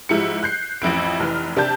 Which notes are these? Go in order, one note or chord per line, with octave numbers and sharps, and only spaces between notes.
G#2 F3 E4 G4 C#7
F#6 G6 C7
A1 F2 E4 D7
F1 E3 F6
C3 D4 G4 A5 G6